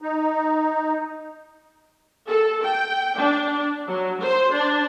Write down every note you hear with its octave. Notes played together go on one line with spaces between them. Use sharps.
D#4
A4
G5
D4
F#3
C5
D4